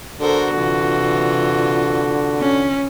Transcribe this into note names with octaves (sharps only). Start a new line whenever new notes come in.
D3 F#4 A4 A#4 C5
C3 E3 F4
C#4